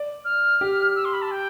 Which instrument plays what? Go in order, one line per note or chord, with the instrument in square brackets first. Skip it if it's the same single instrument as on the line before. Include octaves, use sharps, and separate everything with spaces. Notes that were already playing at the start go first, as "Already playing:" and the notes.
Already playing: [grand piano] D5
[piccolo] F6
[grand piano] G4
[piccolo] E6
C6
B5
A5
G5